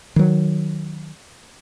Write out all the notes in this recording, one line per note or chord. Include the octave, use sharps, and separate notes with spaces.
D#3 F#3